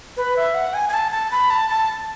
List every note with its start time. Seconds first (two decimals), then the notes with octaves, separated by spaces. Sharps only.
0.17 B4
0.37 E5
0.54 F#5
0.74 G#5
0.89 G#5
0.94 A5
1.12 A5
1.32 B5
1.50 A5
1.70 A5